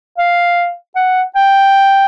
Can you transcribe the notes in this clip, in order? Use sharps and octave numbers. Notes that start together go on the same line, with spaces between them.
F5
F#5
G5